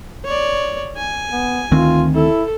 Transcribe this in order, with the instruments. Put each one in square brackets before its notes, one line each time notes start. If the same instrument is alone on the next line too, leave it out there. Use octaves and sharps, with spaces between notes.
[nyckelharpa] C#5 D5
G#5
[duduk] B3
[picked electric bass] D2 D#3 C4 [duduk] F4
[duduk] E4 [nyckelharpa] A4